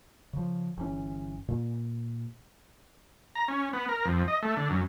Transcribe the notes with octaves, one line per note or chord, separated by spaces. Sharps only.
C#3 F3
G1 E3 C#4
A#2
A#5
C#4
B3
A#4
F2
D#5
A3
D3
F#2